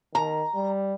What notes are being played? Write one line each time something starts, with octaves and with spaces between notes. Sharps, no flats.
D#3 A#5
G3